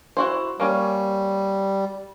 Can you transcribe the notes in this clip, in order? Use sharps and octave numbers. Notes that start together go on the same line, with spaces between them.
E4 F#4 C5
G3 A#3 C#4